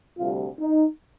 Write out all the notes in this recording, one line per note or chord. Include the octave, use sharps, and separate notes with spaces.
D2 C3 G3 F4
D#4